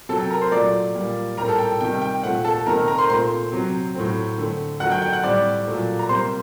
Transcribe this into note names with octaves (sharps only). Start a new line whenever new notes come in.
C3 F#3 C4 A4 A5
G5
A#4 A#5
C5 C6
A#2 F#3 A3 D5 D6
A#2 G3 A#3
A2 G3 C4 A#4 A#5
A4 A5
G5
C3 D#3 G3 G5
G5
A#2 A3 C4 F#5
A4 A5
C3 D#3 A3 C4 A#4 A#5
A#4 A#5
C5 C6
A#2 A3 C4 C5 C6
C3 F#3 C4
A2 F#3 A3 C4
D3 A3 C4
D#3 F#3 A3 F#5 F#6
G5 G6
G5 G6
F#5 F#6
A2 G3 C4 D5 D6
A#2 F#3 A3 C4
A#5
C3 G3 A#3 C5 C6